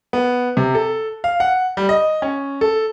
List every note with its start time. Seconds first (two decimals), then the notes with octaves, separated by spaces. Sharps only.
0.13 B3
0.57 C3
0.75 A4
1.24 F5
1.40 F#5
1.77 G3
1.89 D#5
2.22 C#4
2.61 A4